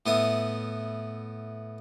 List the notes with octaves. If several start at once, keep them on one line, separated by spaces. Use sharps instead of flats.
A2 B3 E4 D#6